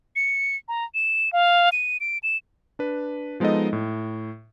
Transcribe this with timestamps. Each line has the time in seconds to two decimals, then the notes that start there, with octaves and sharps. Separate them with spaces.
0.16 C#7
0.68 A#5
0.95 E7
1.33 F5
1.72 D#7
2.00 D7
2.23 E7
2.79 D4 B4
3.40 F3 G#3 B3 D#4 A4 D#5
3.73 A2